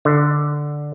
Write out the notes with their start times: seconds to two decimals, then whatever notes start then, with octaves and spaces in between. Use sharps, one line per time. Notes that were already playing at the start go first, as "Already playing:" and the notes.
0.05 D3